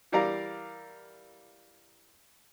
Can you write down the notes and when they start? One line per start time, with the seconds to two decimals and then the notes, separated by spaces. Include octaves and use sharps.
0.12 E3 G3 A#4 D5 F5 A#5